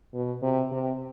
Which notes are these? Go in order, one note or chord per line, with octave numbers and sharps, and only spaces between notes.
B2
C3
C3